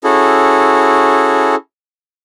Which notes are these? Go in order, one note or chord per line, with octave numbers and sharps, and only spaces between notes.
C#4 E4 F#4 G#4 A4